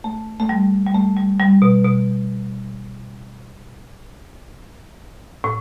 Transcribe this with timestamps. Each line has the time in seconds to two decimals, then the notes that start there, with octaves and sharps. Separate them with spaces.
0.04 A3
0.40 A3
0.49 G3
0.87 G3
0.94 A3
1.17 G3
1.40 G3
1.62 B2
1.85 B2
5.44 A2